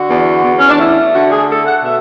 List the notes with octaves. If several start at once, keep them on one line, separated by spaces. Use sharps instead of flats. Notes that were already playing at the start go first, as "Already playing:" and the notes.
Already playing: D3 F#4
E2
E2
C#4
D4
A3 E4
D3 F#4
G#4
A3 A4
F#5
B2 E5